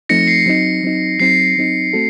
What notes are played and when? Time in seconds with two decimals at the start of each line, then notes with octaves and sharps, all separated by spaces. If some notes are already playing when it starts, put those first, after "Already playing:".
0.09 F3 A3 C4 D#4 A#6 C#7
0.27 C7
0.46 F#3 C4 D#4
0.83 F#3 C4 D#4
1.20 F#3 C4 D#4 C7
1.57 F#3 C4 D#4
1.93 A3 C4 F#4 A4